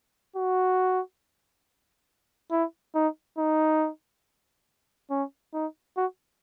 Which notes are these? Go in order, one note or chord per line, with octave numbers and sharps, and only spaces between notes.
F#4
E4
D#4
D#4
C#4
D#4
F#4